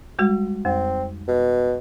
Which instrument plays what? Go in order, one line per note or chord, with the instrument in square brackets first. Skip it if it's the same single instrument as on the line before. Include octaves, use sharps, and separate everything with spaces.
[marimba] G3 G#3 F#4
[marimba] F2 [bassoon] C4
[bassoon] B2